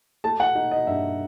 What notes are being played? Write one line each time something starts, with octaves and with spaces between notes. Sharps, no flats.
A3 A5
F#5
D#4
D#5
G2 E5